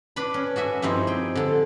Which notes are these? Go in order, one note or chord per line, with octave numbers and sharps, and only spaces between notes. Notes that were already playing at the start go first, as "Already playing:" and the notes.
D4 B4 B5
C#4
F#4 G#4 E5 G#5
G2 F3 C4 D#4 E4
G#4 G5
D3 A4